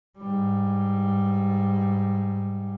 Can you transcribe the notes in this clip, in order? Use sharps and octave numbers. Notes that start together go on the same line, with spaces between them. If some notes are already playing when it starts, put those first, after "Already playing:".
G#2 G3